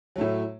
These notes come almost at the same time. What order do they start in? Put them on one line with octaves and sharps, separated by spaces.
F#3 A3 A2